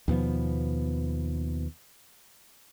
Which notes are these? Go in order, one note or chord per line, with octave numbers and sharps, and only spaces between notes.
D#2 B2 F3 B3